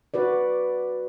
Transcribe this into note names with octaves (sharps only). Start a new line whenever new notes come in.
F#4 B4 D5